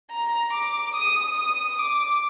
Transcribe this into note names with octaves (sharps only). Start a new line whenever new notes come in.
A#5
D6
D#6
D#6
D6